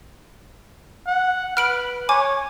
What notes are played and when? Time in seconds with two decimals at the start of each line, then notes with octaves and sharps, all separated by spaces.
1.07 F#5
1.57 B4 F6 D7 F#7
2.09 C#5 G#5 D6